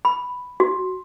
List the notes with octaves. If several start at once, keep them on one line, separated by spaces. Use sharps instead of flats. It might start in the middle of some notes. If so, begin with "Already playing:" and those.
B5
F#4